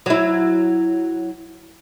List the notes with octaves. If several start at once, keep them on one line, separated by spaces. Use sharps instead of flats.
F#3 E4